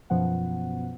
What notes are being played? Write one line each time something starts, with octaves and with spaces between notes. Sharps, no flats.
F#2 B2 F3 B3 F#5